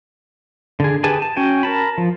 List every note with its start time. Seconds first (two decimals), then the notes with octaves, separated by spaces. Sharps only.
0.80 D3 G#4
1.04 G4 G#4 B4 G#5 A5
1.22 A5
1.36 C#4 F#4 G5 G#5
1.63 A#4 A5 B5
1.98 F3